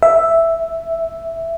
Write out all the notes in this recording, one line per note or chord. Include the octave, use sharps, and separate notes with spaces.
E5